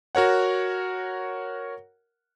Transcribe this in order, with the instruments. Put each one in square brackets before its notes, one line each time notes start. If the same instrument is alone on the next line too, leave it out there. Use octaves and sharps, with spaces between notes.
[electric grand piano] F#4 A#4 C#5 F#5